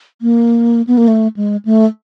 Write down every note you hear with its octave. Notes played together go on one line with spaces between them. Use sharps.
A#3
B3
A#3
A3
G#3
A3